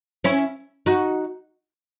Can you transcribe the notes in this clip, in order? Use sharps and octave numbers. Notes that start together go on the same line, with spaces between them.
C#4 E4
D#4 F#4